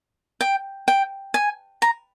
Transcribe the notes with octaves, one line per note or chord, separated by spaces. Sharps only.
G5
G5
G#5
A#5